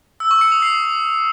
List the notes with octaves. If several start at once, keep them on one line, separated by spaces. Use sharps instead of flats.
E6
C#6
C#7
D#6
C7